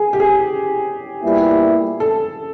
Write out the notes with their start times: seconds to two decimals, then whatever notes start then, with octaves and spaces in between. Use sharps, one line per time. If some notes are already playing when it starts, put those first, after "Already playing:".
Already playing: G#4
0.13 G4
0.20 G#4
1.23 A#2 G3 B3 E4
2.00 A4